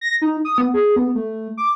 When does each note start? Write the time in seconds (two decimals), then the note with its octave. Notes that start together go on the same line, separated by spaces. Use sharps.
0.01 A#6
0.22 D#4
0.45 D#6
0.58 B3
0.74 G#4
0.96 B3
1.15 A3
1.57 D6